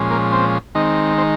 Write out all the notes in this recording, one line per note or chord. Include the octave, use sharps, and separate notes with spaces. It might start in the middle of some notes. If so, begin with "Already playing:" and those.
Already playing: A#2 F3 G#3 C#4
A#3 A#4
C4 C5
D#3 G#3 C4 D#4 D#5
C4 C5